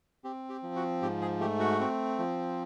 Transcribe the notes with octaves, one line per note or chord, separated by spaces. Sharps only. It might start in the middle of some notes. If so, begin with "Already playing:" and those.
C4 G4
G4
F3
F#4
G#2 G4
G#4
A3 G4
F#4
C4
F3